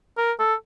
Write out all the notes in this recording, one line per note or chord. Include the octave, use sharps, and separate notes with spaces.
A#4
A4